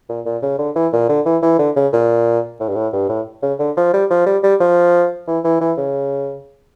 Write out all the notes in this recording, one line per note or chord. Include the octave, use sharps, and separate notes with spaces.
A#2
A#2
C#3
D3
E3
A#2
D3
E3
E3
D3
C#3
A#2
A2
G2
A2
G2
A2
C#3
D3
F3
G3
F3
G3
G3
F3
E3
E3
E3
C#3